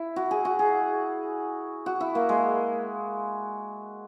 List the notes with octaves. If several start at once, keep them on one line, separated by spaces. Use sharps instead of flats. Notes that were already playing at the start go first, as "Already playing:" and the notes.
Already playing: E4
F#4
G#4
F#4
G#4
F#4
E4
A#3
G#3